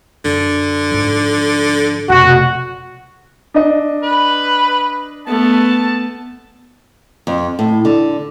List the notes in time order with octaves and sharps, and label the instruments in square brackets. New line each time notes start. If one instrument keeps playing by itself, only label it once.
[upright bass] F#2 [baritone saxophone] D3
[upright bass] G#2 F3
[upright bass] F1 B2 [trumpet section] F#4
[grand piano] D4 D#5
[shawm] B4
[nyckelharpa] A3 B3 [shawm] A5
[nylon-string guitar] F2
A2
D3